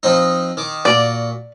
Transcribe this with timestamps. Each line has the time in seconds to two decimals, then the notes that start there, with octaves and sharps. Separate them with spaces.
0.03 F3 C4 D#4
0.57 D#3 D6
0.85 A#2 F#4 D5